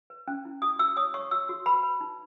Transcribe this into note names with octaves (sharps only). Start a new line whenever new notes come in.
B4
C#4
E4
F#4 D#6
F#4 E6
C#5 D#6
C#5 C#6
F#4 E6
F#4
B4 B5
B4
D#4